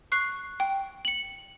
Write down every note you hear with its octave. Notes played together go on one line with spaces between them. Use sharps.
C#6 F#6 C7
G5
C#7 F#7